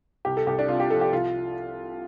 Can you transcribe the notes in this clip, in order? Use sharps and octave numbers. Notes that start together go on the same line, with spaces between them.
C2 G4
A4
C2 G4
D4
C3 F4
G4
F3 A4
G4
C2 F4